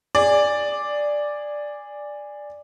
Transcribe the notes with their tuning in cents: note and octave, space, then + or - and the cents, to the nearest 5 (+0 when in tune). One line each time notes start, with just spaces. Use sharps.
G#4 -15 D5 +0